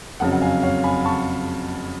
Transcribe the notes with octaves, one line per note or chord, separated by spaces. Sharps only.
F#1 F2 C#3 F#3 F#5 A5
F#5
F5 G#5
C#5 F5
G#5 B5
A5 C#6